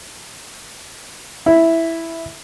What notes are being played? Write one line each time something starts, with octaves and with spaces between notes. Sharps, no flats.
E4